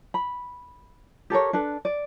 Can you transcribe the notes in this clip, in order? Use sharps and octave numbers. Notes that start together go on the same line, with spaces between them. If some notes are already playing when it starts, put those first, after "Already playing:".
B5
G4 A4 A#4 C#5
D4 A4 B4
D5